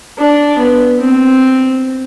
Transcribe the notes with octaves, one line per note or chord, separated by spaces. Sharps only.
D4
B3
C4